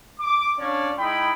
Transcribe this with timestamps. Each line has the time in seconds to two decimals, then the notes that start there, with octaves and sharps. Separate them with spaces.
0.20 D6
0.59 C#4 D4 F4 C#5 D5
0.99 G#3 D#4 E4 G5 B5